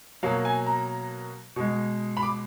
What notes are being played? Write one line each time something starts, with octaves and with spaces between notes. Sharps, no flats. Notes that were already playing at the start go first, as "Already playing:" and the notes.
B2 F#3 A#3 F5
G#5
A#5
B2 G#3
B5
D6